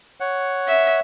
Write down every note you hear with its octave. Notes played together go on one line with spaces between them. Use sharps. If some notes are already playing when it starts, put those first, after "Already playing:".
C#5 F#5
E5